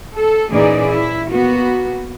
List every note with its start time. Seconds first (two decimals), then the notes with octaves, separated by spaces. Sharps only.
0.14 A4
0.51 A#2 E3 C#4 D#4 G#4 D5
0.88 E4
1.30 A#3 B3 F#4